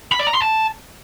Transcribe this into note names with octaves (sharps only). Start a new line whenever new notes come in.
B5
D5
A#5
C6
A5